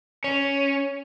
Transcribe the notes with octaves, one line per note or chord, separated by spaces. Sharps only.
C#4